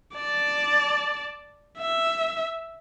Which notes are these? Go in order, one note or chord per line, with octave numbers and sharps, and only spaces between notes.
D5 A5
E5